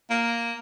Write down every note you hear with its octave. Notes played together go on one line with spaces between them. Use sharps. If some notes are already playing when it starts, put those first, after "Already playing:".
A#3